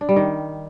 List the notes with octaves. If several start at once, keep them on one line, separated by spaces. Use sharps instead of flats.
D4
G3
D#3